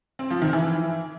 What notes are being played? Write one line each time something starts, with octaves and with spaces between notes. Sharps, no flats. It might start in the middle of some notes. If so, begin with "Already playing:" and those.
C4
F3
D#3
E3